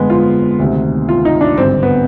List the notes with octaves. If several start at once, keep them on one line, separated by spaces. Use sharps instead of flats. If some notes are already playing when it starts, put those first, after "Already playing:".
Already playing: G1 F2 D3 G#3 B3
F4
D2 C3 D#3
F4
D#4
D4
G#1 G2 D3 C4
B3